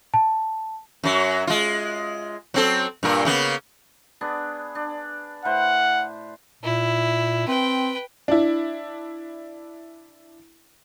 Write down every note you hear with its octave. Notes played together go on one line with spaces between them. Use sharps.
A5
F#2 F#3
G#3 F4
F#3 C4 A4
G2 A#2 A#4
C#3 A#3 B3
B3 D4 G#4
D4
A2 B4 C5 F#5
A#2 E4
C4 B4 G5
D4 E4